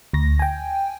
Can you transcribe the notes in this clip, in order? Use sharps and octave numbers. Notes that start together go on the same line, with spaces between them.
D2 A#6
G5 G#5